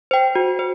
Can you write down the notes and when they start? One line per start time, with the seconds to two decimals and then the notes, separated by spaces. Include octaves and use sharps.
0.11 C5 G5
0.35 F#4
0.59 C5